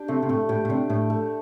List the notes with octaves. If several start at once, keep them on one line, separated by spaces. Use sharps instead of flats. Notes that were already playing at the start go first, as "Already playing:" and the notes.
Already playing: D4 G4
C3 A3
C3
A2 A3
A2 G4
A2
C3 D4
A2 A3
A3